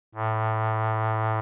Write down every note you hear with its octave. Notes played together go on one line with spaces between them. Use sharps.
A2